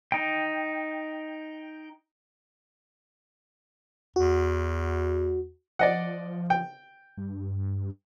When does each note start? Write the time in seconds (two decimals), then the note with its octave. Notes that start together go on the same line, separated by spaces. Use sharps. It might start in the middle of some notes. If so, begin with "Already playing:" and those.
0.12 D#4 G5
4.16 E2 F#4
5.79 F3 D5 D#5 F#5
6.50 G5
7.17 G2